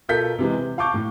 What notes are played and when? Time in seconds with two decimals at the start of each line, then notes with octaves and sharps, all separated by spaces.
0.09 B2 F4 A4 A#4 G6 B6
0.38 C3 E3 G#3
0.58 C3
0.78 F5 A5 C#6 D6 G6
0.94 A2